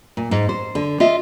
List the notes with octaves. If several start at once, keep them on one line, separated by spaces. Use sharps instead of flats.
A#2
G#2
C5
D3
F4 D#5 E5